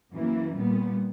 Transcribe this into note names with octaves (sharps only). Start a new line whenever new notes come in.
F#2 E3 A#3
A#2 G3 B3